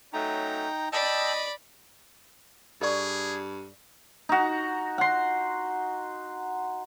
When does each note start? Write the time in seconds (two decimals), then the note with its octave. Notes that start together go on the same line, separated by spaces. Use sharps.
0.13 F#3 A3 C#4 D#4 G5 A#5
0.93 D5 D#5 G5 A5 B5 E6
2.82 G2 G#4 A4 D5 C#6
4.29 D#4 F#4
4.98 F#5 C6